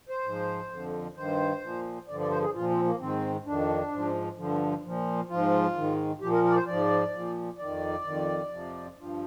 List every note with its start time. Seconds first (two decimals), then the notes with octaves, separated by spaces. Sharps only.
0.09 C5
0.24 G#2 F3
0.71 F2 D3 F3
1.16 G2 D#3 C5
1.62 A#2 F3
2.08 G2 D3 F3 D5
2.20 D5
2.31 C5
2.42 G#4
2.54 A#2 F3 F4
2.70 C4
2.85 A#3
2.99 G#2 D#3 C4
3.45 F2 D#3 D4
3.92 G#2 F3
4.38 G2 D3 F3
4.84 A#2 F3
5.30 G#2 F3 F4
5.76 G#2 D#3
6.21 A#2 F3 G4
6.32 A#4
6.44 A#4
6.50 D5
6.56 C5
6.67 G#2 F3 D5
7.14 A#2 F3
7.58 F2 D#3 D5
8.04 F2 D#3
8.51 F2 C3 F3
8.97 G2 F3